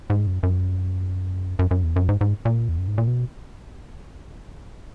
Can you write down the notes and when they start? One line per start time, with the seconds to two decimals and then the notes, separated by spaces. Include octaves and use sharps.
0.10 G#2
0.27 F#2
0.43 F#2
1.59 F#2
1.71 F#2
1.84 E2
1.96 F#2
2.09 G#2
2.21 G#2
2.45 A#2
2.69 E2
2.78 F#2
2.88 G#2
2.98 A#2
3.08 B2